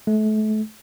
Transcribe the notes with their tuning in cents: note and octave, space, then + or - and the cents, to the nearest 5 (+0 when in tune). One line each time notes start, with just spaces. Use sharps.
A3 -35